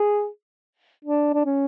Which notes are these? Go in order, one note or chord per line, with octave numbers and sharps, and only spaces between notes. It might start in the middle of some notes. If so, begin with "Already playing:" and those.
Already playing: G#4
D4
D4
C#4